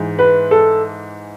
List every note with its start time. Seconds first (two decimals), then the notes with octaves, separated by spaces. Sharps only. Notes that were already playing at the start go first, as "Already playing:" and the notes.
Already playing: G#2 E3
0.19 B4
0.51 A4